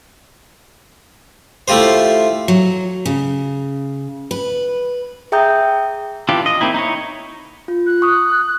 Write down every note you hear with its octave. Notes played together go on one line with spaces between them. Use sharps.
A3 E4 F4 G4 C5
F#3
C#3
B4
G#4 E5 G5 A#5 D#6 G6
E3 D4 F4 G4
D#5
A#3 C4 D#4 E4
D#4 E4 C#5
F4
F#6
C#6 D#6